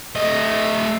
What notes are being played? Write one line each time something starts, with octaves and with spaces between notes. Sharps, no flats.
A3 D#5